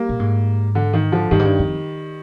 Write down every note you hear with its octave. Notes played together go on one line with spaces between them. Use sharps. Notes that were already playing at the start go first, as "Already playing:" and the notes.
Already playing: G3 A#3
A#2
G#2
D3
D#3
D3 F3
G2 D#3 G3
G#2
G2
F2